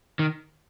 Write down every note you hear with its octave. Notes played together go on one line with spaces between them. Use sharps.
D#3